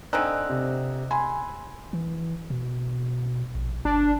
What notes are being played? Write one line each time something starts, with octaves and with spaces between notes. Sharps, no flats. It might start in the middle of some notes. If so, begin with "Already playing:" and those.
D3 C4 D#4 G#5 E6 F#6
C3
G#5 B5 C6
E3
B2
A#1
G1 D4